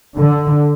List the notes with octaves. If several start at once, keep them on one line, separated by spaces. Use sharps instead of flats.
D3